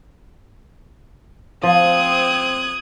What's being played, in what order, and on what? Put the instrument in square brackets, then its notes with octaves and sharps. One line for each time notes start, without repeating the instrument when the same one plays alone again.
[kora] F3 [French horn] C4 [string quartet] D#6 F#6 G#6